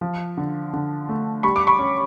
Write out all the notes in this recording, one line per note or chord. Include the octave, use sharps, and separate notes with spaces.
F3
D3
D3
A3
G3 B5 C#6
D6
B5 C#6
C#4